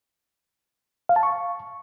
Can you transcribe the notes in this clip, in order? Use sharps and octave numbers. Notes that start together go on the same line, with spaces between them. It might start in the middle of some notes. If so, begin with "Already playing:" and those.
F5
A5
C#6